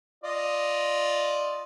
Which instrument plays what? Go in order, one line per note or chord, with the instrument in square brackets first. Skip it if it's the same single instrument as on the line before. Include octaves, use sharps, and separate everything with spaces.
[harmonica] F4 D5 D#5